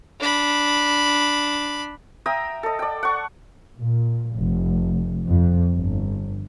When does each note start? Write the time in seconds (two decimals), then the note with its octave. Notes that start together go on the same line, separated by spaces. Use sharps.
0.20 D4 B5
2.26 E5 G5 A#5 D#6
2.63 A4 D#5
2.79 D5 G5
3.03 F#5 C#6
3.79 A#2
4.35 F1
5.27 F2
5.76 G1